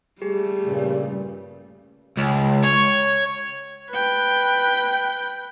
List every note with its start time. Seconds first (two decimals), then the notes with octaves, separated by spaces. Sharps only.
0.22 G3 A3 G4 G#4
0.64 G2 A#2 C#3
2.18 C#2
2.64 C#5
3.91 B4 G5